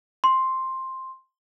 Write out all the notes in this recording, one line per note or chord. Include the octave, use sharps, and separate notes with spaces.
C6